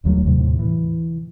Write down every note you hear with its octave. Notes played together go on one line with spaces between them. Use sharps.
D#1 D#2 F#3 A3
D#2 A2 C3
E3